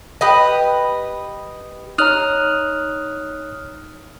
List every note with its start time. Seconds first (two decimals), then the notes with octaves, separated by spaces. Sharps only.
0.21 G4 B4 D#5
1.98 D#4 C#5 A#5 D#6 F6 F#6